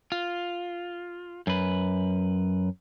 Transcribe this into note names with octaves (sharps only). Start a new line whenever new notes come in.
F4
F#2 B4